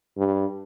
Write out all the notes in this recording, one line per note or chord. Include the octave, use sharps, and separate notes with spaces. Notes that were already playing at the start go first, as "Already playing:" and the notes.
G2